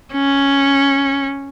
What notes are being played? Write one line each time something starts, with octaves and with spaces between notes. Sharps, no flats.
C#4